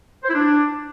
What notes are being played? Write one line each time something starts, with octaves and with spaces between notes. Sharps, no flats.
C5
E4
D4